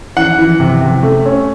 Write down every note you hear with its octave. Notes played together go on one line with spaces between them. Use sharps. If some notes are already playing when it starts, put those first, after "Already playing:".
E3 F#5
E3
C3
C3
A3
C#4